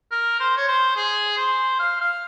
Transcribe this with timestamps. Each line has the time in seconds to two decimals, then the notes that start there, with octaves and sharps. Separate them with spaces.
0.11 A#4
0.40 C5
0.57 C#5
0.68 C5
0.96 G#4
1.37 C5
1.79 F5
2.01 F5